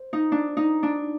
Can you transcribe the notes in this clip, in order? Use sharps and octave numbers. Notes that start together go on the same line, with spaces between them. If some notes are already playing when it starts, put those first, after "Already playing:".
Already playing: C5
D#4
D4
D#4
D4